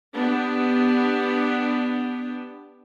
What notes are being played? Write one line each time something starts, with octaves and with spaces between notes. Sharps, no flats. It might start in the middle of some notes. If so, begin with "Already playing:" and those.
B3 D4 G4